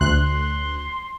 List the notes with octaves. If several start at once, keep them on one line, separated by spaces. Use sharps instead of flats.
D2 C6 F#6